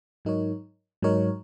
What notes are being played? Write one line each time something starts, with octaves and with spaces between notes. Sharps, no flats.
G#2 F#3 D#4 A#4 C#5
G#2 F#3 D#4 A#4 C#5